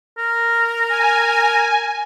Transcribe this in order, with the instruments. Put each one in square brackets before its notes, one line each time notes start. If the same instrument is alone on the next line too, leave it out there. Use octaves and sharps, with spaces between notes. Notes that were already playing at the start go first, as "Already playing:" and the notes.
[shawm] A#4
[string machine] G#5